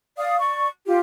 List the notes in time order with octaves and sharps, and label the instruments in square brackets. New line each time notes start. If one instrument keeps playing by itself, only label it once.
[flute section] D5 F5 D#6
D5 C#6
F4 G4